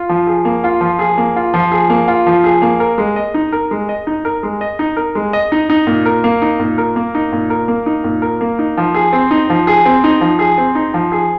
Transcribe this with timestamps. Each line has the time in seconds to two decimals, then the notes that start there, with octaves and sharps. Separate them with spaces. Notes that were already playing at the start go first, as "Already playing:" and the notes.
Already playing: F4
0.09 F3
0.27 G#4
0.45 A#3
0.64 F4
0.81 F3
0.99 G#4
1.18 A#3
1.36 F4
1.54 F3
1.72 G#4
1.90 A#3
2.08 F4
2.26 F3
2.44 G#4
2.62 A#3
2.80 A#4
2.98 G#3
3.16 D#5
3.34 D#4
3.52 A#4
3.71 G#3
3.89 D#5
4.07 D#4
4.25 A#4
4.43 G#3
4.61 D#5
4.79 D#4
4.97 A#4
5.15 G#3
5.33 D#5
5.52 D#4
5.70 D#4
5.87 A#2
6.06 A#4
6.24 A#3
6.42 D#4
6.60 A#2
6.78 A#4
6.96 A#3
7.15 D#4
7.32 A#2
7.50 A#4
7.68 A#3
7.86 D#4
8.04 A#2
8.22 A#4
8.41 A#3
8.59 D#4
8.77 F3
8.94 G#4
9.13 C4
9.31 D#4
9.50 F3
9.67 G#4
9.85 C4
10.04 D#4
10.21 F3
10.39 G#4
10.58 C4
10.75 D#4
10.94 F3
11.12 G#4